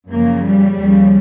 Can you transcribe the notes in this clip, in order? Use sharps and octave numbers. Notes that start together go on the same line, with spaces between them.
F#2 C#3 F3 A#3
G3
D#2 C#3 F3